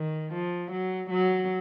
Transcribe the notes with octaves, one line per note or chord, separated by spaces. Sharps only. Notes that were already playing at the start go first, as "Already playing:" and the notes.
Already playing: D#3
F3
F#3
F#3